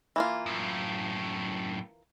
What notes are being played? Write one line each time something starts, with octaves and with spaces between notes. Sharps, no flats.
E3 A#3 F4
F#2 A2